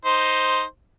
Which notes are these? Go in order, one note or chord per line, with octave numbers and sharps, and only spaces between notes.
D#4 C5